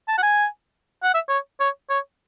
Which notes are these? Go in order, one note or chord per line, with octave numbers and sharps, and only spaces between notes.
A5
F#5
G#5
F#5
E5
C#5
C#5
C#5